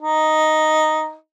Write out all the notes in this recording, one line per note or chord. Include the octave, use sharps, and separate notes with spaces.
D#4